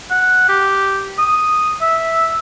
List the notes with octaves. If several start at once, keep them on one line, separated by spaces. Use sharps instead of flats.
F#5
G4
D#6
E5